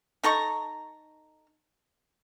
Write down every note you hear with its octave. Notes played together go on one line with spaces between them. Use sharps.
D#4 A4 A#5 C#6